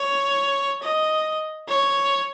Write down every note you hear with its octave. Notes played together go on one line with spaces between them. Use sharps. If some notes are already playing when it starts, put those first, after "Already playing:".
Already playing: C#5
D#5
C#5